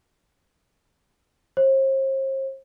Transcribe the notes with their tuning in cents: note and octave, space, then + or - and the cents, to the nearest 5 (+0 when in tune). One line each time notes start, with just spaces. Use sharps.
C5 +40